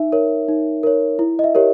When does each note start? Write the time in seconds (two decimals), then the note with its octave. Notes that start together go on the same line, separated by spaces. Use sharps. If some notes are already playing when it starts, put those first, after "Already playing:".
Already playing: D#4 E5
0.12 A#4 C#5
0.48 D#4
0.83 A#4 C#5
1.19 E4
1.39 D#5
1.44 E5
1.55 G4 A#4 C#5